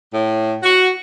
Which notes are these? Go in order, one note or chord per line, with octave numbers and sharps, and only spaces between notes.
A2
F#4